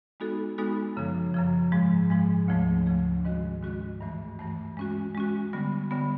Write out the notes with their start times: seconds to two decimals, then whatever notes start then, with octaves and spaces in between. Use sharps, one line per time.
0.20 G#3 B3 D#4 F#4 A4
0.58 G#3 B3 D#4 F#4 A4
0.96 F#2 C#3 F3
1.34 F#2 C#3 F3
1.72 G#2 F3 G#3
2.10 G#2 F3 G#3
2.48 D2 C#3 F3 A3
2.86 D2 C#3 F3 A3
3.25 G#2 D#3 G#3 C#4 F#4
3.63 G#2 D#3 G#3 C#4 F#4
4.01 G2 E3 A3
4.39 G2 E3 A3
4.77 G#3 C#4 F#4
5.15 G#3 C#4 F#4
5.53 D3 G3 B3
5.91 D3 G3 B3